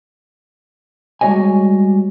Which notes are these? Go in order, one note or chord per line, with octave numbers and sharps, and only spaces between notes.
G3 G#3 F#4 C#5 D#5 G#5